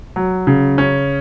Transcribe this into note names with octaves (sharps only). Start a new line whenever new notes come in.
F#3
C#3
C#4